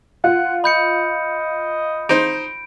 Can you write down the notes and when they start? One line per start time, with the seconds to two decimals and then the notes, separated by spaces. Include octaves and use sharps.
0.24 F4 F#5
0.64 D#5 B5 G6 C#7
2.09 D#4 C5 D7